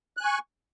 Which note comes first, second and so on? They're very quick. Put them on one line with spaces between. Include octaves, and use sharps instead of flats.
F#6 G#5 C#6